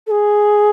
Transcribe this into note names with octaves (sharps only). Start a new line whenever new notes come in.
A4
G#4